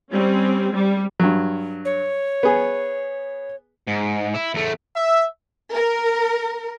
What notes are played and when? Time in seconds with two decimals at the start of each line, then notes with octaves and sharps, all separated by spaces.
0.11 G3 C4 C#4
0.73 G3
1.20 G2 F#3
1.85 C#5
2.43 B3 G#4
3.87 G#2
4.34 E4
4.54 E2 A3
4.96 E5
5.73 A#4